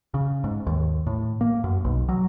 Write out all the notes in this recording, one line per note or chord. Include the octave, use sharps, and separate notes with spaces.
C#3
G#2
D#2
A2
A#3
F#2
B1
F#3